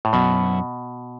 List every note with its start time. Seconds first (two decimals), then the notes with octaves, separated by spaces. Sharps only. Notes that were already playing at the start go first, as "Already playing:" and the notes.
0.05 A2
0.13 F#2 B2 F#3 B3 E4